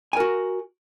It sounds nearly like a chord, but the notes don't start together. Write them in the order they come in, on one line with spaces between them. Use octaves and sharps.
G#5 A#4 F#4